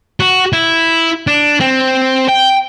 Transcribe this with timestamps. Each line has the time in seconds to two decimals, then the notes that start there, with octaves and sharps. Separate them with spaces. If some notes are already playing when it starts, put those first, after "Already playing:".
0.20 F#4
0.53 E4
1.27 D4
1.60 C4
2.28 G5